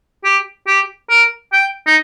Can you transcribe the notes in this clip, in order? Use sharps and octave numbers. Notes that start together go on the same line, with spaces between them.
G4
G4
A#4
G5
D#4